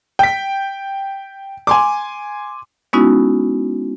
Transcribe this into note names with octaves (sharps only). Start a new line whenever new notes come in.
G5 B6
G#5 C6 D6
G#3 B3 C#4 D#4 E4 F#4